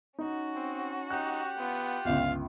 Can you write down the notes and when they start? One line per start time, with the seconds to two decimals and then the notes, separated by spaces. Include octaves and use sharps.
0.18 C#4 D#4 F#4
0.56 C4
1.10 D#4 G4 F#5 F#6
1.59 B3 F4
2.05 G1 C#2 F5